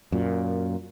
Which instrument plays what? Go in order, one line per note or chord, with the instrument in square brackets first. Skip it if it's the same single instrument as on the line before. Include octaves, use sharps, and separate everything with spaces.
[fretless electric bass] F#2 A#2